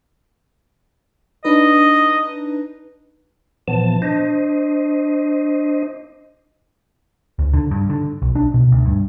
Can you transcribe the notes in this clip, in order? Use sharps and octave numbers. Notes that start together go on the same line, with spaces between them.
D4 D#4 B4 D#5
A#2 E3 F3 B3 A5
D4 C5 D#5
D2
D3
G2
D3
B1
D4
B2
D2
G2